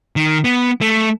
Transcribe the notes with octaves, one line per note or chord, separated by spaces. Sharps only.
D#3
B3
A3